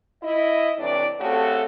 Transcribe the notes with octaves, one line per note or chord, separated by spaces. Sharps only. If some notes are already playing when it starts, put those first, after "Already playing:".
E4 D#5
A2 C3 E3 D4 D5
C#3 A3 C4 F#4 G4 A4